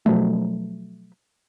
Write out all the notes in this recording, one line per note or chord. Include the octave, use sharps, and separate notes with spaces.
B2 F3 F#3 A3